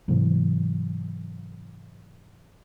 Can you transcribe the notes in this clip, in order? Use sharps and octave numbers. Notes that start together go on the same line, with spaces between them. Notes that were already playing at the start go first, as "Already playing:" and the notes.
G#2 C3 E3 F#3